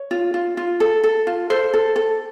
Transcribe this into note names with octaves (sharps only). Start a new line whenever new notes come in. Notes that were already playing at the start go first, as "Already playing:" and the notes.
Already playing: C#5
F4
F4
F4
A4
A4
F4
A4 C5
A4
A4